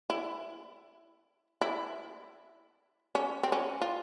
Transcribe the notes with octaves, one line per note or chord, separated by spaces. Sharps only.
E4
E4
C#4
C4
C#4
F4